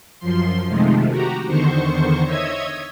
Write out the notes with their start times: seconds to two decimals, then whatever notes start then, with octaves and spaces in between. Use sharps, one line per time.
0.19 F#2 F3 C6
0.67 C3 D#3 F3 G#3 A3
1.09 F#4 G4 A#5
1.46 E2 D3 D#3 C5 C#6
2.24 C#5 D#5 E5 E6 G#6